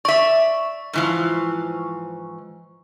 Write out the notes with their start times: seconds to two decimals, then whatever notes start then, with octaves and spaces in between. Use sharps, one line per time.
0.05 D5 E5 C#6
0.93 G#2 E3 F3